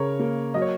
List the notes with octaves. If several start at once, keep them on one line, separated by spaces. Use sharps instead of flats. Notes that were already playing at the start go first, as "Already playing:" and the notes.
Already playing: C#3 A#4 C#5
A#3
F#3 D#5
C#5